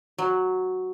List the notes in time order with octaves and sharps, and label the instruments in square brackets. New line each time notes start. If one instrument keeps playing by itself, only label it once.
[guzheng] F#3